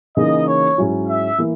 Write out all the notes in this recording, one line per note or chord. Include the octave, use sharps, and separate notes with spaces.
C#3 E3 A#3 D#4 D#5
C#5
G#2 F#3 C#4 E4
E5
E3 A#3 E4